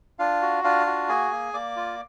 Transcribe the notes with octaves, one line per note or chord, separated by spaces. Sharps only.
D4 F4 F5
F#4
D4 F4 F5
F#4
A#3 G#4 G#5
A#3
A#3 D5 D6
F4